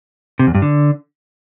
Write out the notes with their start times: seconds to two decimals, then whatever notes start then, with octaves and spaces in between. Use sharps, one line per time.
0.39 C3
0.47 E2
0.55 G2
0.62 D3